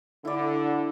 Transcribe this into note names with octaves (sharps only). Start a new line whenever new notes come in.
D3 E4 D5